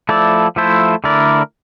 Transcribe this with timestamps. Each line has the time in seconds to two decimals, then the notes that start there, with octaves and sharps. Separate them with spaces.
0.09 F3 A3 E4 A4 D5
0.56 F3 A3 E4 A4 C5
1.04 D3 A3 E4 A#4 D5